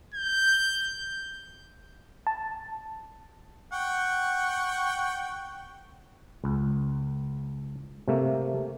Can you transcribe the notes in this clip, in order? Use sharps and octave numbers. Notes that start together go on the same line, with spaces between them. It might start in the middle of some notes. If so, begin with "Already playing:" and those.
G6
A5
F#5 G5 C#6
C#2
C3 A3 A#3